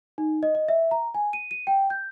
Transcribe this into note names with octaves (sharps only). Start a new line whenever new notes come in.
D#4
D#5
D#5
E5
A#5
G#5
D#7
D#7
G5
G6